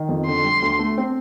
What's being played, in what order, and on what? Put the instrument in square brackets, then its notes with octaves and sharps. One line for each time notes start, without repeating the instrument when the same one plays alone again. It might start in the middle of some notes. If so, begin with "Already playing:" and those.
Already playing: [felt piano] D#3
F2
[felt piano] D3 [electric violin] C6
[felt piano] G3
D2
A3
C4